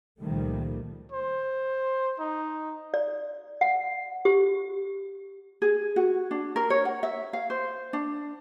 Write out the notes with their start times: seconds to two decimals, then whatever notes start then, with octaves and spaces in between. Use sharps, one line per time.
0.20 C#2 A#2 D#3 F3 G3 A3
1.12 C5
2.19 D#4
2.94 D5
3.61 F#5
4.25 G4
5.62 G#4
5.96 F#4
6.31 D4
6.56 A#4
6.70 C#5
6.85 F#5
7.03 E5
7.33 F5
7.50 C5
7.93 D4